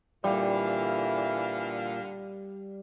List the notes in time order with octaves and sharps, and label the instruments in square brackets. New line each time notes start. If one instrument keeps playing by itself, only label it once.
[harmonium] A#2 [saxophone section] D3 F5 [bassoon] E3 [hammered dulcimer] G3